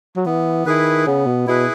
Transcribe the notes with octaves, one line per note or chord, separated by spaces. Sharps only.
F#3
E3 B3
D#3 E4 G#4 B4
C#3 B3
B2
B2 E4 G#4 B4